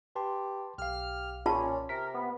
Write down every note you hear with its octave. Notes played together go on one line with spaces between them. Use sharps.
G4 B4 A5 C6
B1 G4 F5 F6
A#2 C#4 F4 A5
C3 A#4 B6
B3